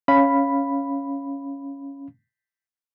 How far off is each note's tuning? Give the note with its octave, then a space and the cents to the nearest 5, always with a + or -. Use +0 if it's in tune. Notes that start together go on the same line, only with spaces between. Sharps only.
C#4 +0 F5 -10 B5 +0